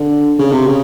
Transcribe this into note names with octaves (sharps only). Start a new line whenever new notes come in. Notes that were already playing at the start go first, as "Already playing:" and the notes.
Already playing: D3
C#3
C3
C#3